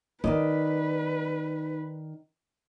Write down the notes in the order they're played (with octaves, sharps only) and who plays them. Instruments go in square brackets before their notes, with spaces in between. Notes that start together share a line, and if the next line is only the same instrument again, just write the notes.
[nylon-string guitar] D#3 D5 D#5 [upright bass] D#4 [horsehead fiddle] B4